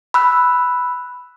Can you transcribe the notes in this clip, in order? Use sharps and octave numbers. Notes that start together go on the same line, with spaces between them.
B5 E6 F#6